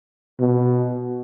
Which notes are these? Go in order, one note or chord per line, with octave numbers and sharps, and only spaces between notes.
B2